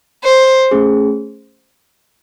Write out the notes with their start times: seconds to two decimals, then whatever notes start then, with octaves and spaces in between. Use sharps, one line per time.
0.24 C5
0.71 A3 C#4 G#4